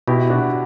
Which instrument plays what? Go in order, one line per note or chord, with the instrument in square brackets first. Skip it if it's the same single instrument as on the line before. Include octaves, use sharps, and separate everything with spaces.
[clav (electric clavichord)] B2 [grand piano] E4 G4
[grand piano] D4 F#4